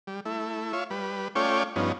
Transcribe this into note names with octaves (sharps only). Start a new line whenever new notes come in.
G3
A3 E4
F4 C#5 E5
G3 B4
A3 C#4 F4 C#5 D5 G5
G2 F3 B3 C#4 D#4